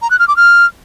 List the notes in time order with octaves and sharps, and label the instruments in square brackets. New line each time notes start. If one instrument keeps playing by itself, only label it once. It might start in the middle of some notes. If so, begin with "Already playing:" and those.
[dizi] A#5
F#6
F6
D6
F6